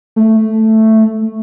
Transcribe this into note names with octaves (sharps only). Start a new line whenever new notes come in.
A3